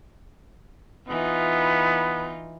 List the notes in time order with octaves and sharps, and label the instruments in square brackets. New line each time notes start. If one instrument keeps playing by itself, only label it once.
[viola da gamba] E3 D#4 F4 [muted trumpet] B3